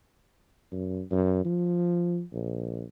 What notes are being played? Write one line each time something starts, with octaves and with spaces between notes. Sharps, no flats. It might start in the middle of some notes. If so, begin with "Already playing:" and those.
F#2
F#2
F3
A#1